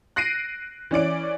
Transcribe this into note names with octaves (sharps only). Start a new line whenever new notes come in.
F#6 A#6 C7 D7 D#7
E3 C#4 D5 D7